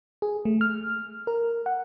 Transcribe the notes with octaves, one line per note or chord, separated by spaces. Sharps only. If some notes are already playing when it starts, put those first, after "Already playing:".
G#4
A3
F6
A#4
F#5